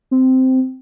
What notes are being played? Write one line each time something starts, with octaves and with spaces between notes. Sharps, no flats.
C4